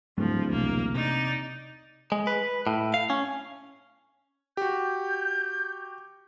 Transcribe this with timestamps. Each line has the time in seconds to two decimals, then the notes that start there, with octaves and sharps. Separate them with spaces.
0.18 D1 G#2 F3 G3 A3
0.52 E1 C2 A#3
0.95 C3 D#4 D5
2.12 G#3
2.27 B4
2.67 A2
2.94 F5
3.10 C#4
4.57 F#4 G4 G6